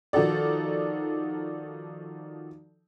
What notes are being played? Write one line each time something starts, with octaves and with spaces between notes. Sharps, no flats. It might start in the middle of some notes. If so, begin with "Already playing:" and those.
D#3 F3 D#4 F#4 A4 D5